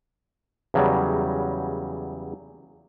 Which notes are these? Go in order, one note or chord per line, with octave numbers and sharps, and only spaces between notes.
E2 C#3 F#3 G3